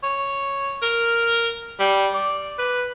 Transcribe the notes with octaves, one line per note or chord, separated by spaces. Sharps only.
C#5
A#4
G3
D5
B4